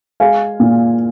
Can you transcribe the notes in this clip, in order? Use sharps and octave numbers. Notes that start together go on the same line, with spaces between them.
G#3 F5 G#5
A#2